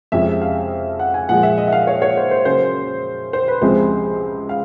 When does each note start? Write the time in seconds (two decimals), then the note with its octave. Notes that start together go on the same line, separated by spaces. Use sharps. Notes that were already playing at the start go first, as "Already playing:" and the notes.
0.12 F2 C3 F3 G#3 C#4 E5
0.41 F5
0.99 F#5
1.14 G#5
1.29 A#2 F3 G#3 F#5
1.43 E5
1.58 D#5
1.67 E5
1.72 F5
1.87 C#5
2.02 C#5
2.17 C5
2.31 C5
2.45 C#3 F#3 A#3 C#4 C5
3.33 C5
3.48 B4
3.62 C#2 C3 F3 G#3 C4 C5
4.49 F5